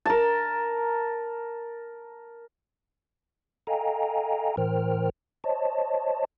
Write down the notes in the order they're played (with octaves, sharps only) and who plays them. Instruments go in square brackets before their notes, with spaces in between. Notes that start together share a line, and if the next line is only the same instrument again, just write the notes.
[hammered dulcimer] A#4 A5
[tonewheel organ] A4 D#5 F5 G5 G#5 A#5
A2 E3 A#4 C5 G5 F6
C5 C#5 D#5 A5